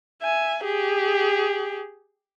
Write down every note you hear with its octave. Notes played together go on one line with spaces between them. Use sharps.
E5 G#5
G4 G#4